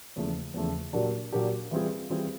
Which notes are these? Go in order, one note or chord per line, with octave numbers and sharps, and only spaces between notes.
E2 C#3 F3 A3
E2 C#3 F3 A3
A#2 F#3 A#3 D4 G4
A#2 F#3 A#3 D4 G4
E3 G3 C4 F4 G#4
E3 G3 C4 F4 G#4